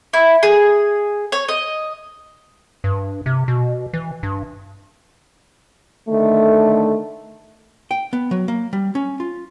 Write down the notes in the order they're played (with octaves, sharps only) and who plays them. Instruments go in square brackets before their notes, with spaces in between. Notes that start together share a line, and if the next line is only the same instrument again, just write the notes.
[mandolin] E4
G#4
C#5
D#5
[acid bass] G2
C3
B2
E3
G2
[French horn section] D3 D#3 A3
[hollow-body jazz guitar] G5
B3
F#3
A#3
G3
C#4
F4